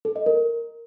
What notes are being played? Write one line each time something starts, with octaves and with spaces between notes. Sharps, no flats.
A4
D#5
A#4